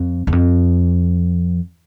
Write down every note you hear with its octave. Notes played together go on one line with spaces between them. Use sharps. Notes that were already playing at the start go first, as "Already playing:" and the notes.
Already playing: F2
E2
F2